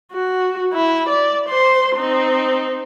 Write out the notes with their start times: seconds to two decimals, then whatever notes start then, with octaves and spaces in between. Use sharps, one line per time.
0.12 F#4
0.74 E4
1.09 D5
1.49 C5 C6
1.96 C4 D#4